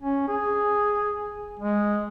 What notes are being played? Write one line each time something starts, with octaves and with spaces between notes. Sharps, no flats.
C#4
G#4
G#3